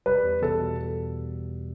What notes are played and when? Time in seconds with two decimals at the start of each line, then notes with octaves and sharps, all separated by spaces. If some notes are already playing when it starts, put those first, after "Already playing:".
0.06 G3 B4
0.24 E2
0.42 E2 A4
0.60 B2